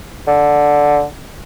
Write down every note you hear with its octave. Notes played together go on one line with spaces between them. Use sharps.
D3